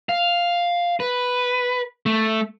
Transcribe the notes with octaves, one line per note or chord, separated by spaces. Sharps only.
F5
B4
A3